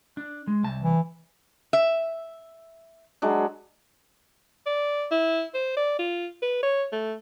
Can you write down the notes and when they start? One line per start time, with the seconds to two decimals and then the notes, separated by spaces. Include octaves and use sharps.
0.17 D4
0.47 G#3
0.63 C2 A5
0.82 E3
1.73 E5
3.22 F#3 G#3 D4
4.66 D5
5.11 E4
5.54 C5
5.76 D5
5.99 F4
6.42 B4
6.63 C#5
6.92 A3